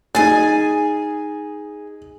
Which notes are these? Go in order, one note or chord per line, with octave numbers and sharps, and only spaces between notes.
D#4 G#4 G#5 A6